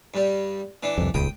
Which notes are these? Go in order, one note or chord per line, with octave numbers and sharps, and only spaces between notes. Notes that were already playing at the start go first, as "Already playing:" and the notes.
G2 G3
E3 D4
C2 F2
D#1 C#2 G5 D#6